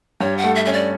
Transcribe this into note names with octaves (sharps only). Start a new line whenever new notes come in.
G2 C#5
F#5
A3
E5
C#4 E5
D5